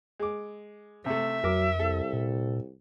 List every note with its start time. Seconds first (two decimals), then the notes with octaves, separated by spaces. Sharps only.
0.20 G#3 D6
1.06 C3 A3 E5
1.44 F2 F#3 A#4 D6
1.80 C2 A4
2.13 A#2